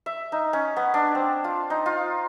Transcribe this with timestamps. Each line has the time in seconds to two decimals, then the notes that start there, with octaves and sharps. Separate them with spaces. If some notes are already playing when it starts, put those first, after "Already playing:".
0.06 E5
0.32 D#4
0.53 C#4
0.76 B3
0.94 D4
1.15 C4
1.44 F4
1.70 D#4
1.86 F4